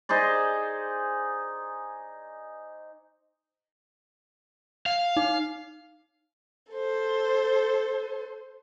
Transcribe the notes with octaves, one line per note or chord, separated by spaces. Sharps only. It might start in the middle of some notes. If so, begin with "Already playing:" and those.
D#4 G#4 C5 D5
F5
D#4
A4 C5